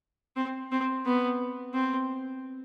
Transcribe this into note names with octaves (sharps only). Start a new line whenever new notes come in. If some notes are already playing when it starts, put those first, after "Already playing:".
C4
C4
B3
C4